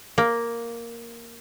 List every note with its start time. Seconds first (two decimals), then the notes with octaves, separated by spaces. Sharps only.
0.18 A#3